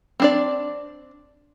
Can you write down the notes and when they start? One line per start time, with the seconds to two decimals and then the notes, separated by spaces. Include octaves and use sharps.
0.20 C4 D4 D5